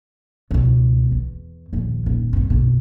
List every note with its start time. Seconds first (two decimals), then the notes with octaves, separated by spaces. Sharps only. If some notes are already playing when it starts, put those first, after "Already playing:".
0.51 C#2 B2
1.12 E2
1.73 A#1 D#2
2.06 D#1
2.33 G2 C3
2.50 F#1 B2